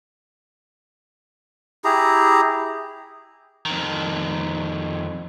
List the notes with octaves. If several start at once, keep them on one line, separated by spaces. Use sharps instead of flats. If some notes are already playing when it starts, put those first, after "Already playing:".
E4 G4 G#4 A#5
F2 D#3